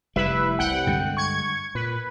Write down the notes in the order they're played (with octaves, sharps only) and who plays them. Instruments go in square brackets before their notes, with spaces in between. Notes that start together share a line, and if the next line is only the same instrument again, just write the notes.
[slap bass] F1 G3 [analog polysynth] E4 B4 E5
[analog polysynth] C2 F#5 G5
[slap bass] G2 D3 G#3
[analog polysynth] C#6 G#6
[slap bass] A#2 [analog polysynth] B4